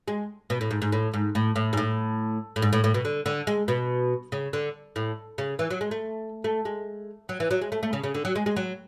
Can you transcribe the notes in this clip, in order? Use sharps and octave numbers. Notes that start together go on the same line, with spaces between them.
G#3
B2
A2
G#2
G#2
A2
G#2
A2
A2
G#2
A2
A2
G#2
A2
A2
B2
D3
D3
G#3
B2
C#3
D3
A2
C#3
E3
F#3
G#3
A3
A3
G#3
F#3
E3
F#3
G#3
A3
A3
C#3
C#3
D3
F#3
G#3
G#3
F#3